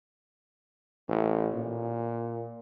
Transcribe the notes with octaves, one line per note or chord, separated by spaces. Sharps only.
A1
A#2